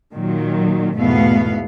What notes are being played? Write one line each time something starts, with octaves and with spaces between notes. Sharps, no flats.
A#2 D#3 F#3
E2 G#2 B2 A3 B3 F5